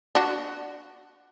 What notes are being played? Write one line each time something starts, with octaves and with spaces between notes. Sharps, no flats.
D4 F#4